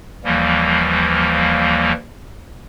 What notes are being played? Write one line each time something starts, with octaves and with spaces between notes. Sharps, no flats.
D#2 E3 F3 G3 A#3